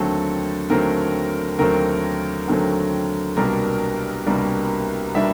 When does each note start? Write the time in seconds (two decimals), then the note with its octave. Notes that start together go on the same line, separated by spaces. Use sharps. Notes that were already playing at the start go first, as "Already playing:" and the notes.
Already playing: D#2 D3 F#3 A3 C4 A4
0.70 D#2 D3 F#3 A3 C4 A#4
1.59 D#2 D3 F#3 A3 C4 A#4
2.48 D#2 D3 F#3 A3 C4
3.37 C2 B2 G3 A#3 D4 A#4
4.26 C2 B2 G3 A#3 D4
5.15 B2 G3 A#3 D4 E5